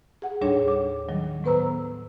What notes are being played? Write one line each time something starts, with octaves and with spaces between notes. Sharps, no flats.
G#4 F#5
D#2 A2 G3 D4 G#4 C#5
D6
D#3 F#3 G3
A2 B3 B4 C5 A#5 E6